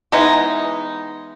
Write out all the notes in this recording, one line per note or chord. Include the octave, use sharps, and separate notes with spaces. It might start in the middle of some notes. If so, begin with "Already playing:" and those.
E3 G#3 B3 D#4